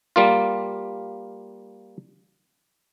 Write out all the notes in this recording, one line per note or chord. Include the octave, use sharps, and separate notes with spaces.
G3 A#3 F4